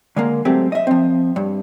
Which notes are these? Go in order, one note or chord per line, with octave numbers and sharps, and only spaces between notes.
D3 G#3 A#3
F#3 G#3 A3 C4 G4
D#5 E5
F3 C4
G2